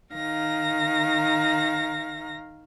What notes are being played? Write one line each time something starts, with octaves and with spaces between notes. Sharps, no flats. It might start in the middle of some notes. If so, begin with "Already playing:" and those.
D#3 F5 A#5 A#6